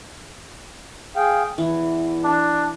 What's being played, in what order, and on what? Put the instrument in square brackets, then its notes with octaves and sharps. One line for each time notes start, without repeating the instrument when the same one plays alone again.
[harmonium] G#4 F5 G5
[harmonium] E2 [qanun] E3
[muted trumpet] D4